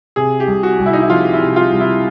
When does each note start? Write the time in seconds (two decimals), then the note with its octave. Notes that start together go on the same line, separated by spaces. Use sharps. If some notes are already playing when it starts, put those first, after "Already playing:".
0.16 C3 G#4
0.40 G4
0.47 C2
0.63 F#4
0.79 C2
0.86 E4
0.93 D#4
1.01 E4
1.10 F3 F4
1.33 E4
1.41 C3
1.56 F4
1.72 C2
1.80 E4